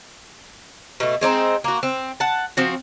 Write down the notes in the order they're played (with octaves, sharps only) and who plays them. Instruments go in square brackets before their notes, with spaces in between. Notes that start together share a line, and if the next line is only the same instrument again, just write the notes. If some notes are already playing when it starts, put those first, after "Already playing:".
[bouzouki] B2 A3
G#3 C4 D4 D#4
A#3 F#4
C4
F#5 A5
F3 C4 F#4